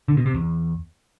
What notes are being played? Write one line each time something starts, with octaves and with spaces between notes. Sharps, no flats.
D3
B2
C3
E2